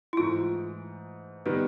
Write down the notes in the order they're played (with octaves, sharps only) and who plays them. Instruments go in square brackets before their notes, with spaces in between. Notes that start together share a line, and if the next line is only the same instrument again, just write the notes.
[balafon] E4
[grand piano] G#2 E3 A3 [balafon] F4
[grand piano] D#3 G3 B3 [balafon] B4